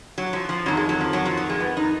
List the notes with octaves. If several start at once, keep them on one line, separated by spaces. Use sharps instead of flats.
F#3
F3
F3
F2 D#3 F#3
G#3
F#3
F3
F#3
F3
F#3
G#3
B3
D#4